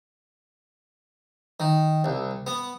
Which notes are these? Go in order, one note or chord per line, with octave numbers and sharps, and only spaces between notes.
D#3
C2
B3